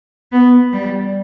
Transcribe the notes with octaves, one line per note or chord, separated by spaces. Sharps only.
B3
G3